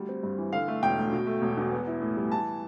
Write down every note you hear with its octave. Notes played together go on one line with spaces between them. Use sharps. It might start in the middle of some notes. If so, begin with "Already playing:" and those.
Already playing: D2 G3
C4
G2
E3
D3 F5
A3
E1 G5
D2
B2
A3
E1
E2
B3
E4
A2
G3
E3 A5